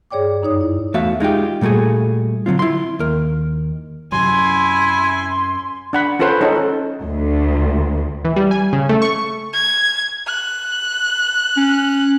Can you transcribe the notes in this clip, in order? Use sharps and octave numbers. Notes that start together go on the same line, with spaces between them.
G2 G#4 C#5 D5 G5 D6
F#2 D#4 C#5 D#6
E4
E2 A3 F#4 E5 F5
G#3 D#4 F4 G4
A#2 G3 A3 F#4 G#4
D3 F#3 C4 F4
E4 C6
D#2 A#4
F#2 C3 F#3 E4 G#5 C6
D4 F#5 B5
C#4 F4 A4 B4 C5 F#5
C#4 D#4 A4
A4
D2
E3
G3
G#5
C#3
A3
C#6
G#6
F#6
C#4